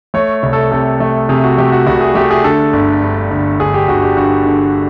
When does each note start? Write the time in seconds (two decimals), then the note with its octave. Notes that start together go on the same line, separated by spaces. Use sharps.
0.14 A3 C#5
0.43 C2
0.53 A4
0.71 C3 A4
1.00 A3
1.29 C3 G#4
1.43 F#4
1.58 A3 G4
1.72 F#4
1.87 C2 F#4
2.01 G#4
2.15 A3 G4
2.31 G#4
2.44 D3 A4
2.73 G1
3.02 G2
3.31 G1
3.59 G1 G#4
3.74 G4
3.88 G1 F#4
4.02 G4
4.17 G2 F#4
4.46 D3